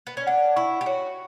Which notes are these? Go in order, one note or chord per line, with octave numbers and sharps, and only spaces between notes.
B3
C#4
D4 F#5
E4 C#6
G4
F#4 C#5